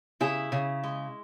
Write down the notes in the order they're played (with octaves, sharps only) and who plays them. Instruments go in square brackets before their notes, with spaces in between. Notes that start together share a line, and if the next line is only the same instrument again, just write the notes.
[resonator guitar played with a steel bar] C#3 E4 G#4
C#3
G#3